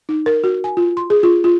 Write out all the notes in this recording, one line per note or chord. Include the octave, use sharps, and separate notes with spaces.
D#4
A#4
F#4
G#5
F4
C6
G#4
F4
F4